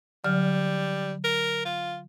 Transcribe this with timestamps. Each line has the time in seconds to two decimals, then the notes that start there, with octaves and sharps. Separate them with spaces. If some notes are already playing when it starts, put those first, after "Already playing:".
0.24 D3 F#3 G3 F6
1.24 A#4
1.65 F4